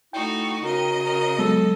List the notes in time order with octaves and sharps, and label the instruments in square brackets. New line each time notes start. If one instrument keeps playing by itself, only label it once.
[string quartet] A3 D#4 F#4 [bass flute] E4 [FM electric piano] G5
[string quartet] C#3 D#5 [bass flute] F#4 [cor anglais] A#4
[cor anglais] A#4
[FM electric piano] F#3 G#3 B3 [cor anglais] A4